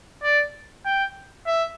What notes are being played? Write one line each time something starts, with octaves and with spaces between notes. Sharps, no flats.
D5
G5
E5